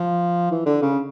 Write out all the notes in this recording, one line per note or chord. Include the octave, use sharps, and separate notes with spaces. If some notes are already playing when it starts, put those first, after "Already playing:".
Already playing: F3
E3
D3
C#3